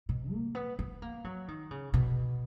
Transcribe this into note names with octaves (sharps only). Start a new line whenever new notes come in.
B2
A#3
B3
B3
A#3
F#3
D#3
C#3
B2